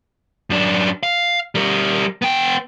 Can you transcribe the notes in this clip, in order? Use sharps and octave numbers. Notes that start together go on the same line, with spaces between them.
F#2 D4
F5
G3 A#4
B3 G5